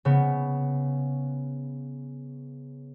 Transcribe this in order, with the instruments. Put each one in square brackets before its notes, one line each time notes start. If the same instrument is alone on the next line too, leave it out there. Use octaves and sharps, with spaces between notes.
[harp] C#3 B3